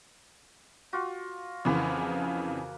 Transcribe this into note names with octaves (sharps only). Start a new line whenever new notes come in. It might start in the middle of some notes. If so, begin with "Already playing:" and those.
F4 F#4
F2 C#3 E3 A#3 B4 F#5